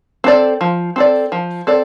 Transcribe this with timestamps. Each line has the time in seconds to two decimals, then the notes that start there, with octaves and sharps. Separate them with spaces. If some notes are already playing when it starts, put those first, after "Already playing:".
0.24 C4 A4 D5
0.61 F3
0.96 C4 A4 D5
1.32 F3
1.67 C4 A4 D5